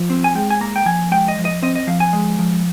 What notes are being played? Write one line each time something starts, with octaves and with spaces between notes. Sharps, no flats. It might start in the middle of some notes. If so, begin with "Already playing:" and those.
Already playing: F3
C4
G#5
G#3 G5
G#5
A#3 A#5
G5
F3 G#5
G#3 G5
D#5
F3
D#5
C4 D#5
D#5
F3 F5
G#5
G#3
F3